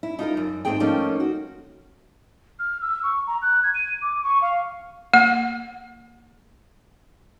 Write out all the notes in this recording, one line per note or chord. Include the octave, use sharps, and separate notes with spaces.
E4
D#4 F4 A4 A#4
F#2
G#2 G#3 A3 C4 G#4 G5
F3 A3 A#3 C#4 D#4
F#4
F6
E6
C#6
A#5
F#6
G#6
D#7
D6
C#6
F5
A#3 F#5